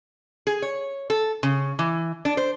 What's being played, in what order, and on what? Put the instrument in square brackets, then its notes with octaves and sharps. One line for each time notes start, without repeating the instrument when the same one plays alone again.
[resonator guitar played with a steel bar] G#4
C#5
A4
C#3
E3
D4
C5